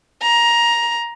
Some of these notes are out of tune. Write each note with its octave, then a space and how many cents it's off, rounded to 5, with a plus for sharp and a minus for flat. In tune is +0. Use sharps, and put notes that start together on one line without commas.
A#5 +15